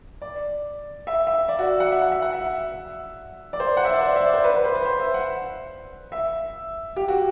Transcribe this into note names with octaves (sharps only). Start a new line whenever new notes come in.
D5
E5
E5
D5
F#4
F#5
E5
F#5
E5
F#5
E5
D5
C5
F#5
E5
D5
C5
E5
D5
C5
B4
B4
C5
B4
C5
E5
F#5
E5
G4
F#4